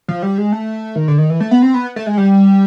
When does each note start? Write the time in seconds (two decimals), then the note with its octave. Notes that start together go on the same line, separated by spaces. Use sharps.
0.08 F3
0.23 G3
0.38 G#3
0.52 A3
0.96 D#3
1.08 D3
1.18 D#3
1.30 E3
1.40 A3
1.51 B3
1.62 C4
1.74 B3
1.96 A3
2.06 G#3
2.17 G3